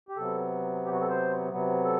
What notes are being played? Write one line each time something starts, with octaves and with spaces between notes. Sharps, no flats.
G4
C3 F#3 B3 A4
G4
F#4
A4
C5
C3 F#3 B3
A4